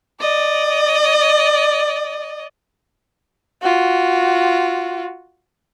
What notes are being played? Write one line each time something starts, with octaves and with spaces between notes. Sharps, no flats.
D5 D#5
F4 F#4